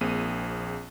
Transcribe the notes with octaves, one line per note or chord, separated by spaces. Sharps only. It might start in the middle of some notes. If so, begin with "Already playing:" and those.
A#1 A#3 C4 G#4 D#7